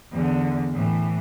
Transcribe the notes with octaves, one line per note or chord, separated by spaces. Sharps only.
E2 D3
A2 E3